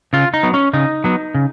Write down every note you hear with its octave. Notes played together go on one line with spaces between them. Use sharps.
C#3 F4
D#4
F#3 B3
C#4
C#3 D#4
F#3 B3
C#3